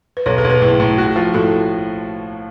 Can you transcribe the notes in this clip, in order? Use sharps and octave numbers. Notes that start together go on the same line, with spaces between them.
B4
B1 A4 C#5
G#4 B4
B1
G#4 B4
A2 G#4 B4
A2
F#4
F3
A2 F#4 A4